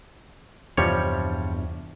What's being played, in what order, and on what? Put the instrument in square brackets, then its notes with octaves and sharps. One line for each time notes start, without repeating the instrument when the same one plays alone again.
[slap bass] E2 G2 C3 [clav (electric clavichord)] F3 G3 C#5